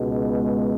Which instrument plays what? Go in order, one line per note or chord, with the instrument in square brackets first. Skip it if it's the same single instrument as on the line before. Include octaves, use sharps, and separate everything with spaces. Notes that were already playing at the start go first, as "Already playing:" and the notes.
Already playing: [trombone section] C#2 B2 G#3